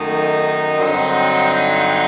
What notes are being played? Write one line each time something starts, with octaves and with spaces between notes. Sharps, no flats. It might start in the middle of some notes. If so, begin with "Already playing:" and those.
Already playing: F#2 D#3 A3 D#4
G2 D3 F#3 C4 D#4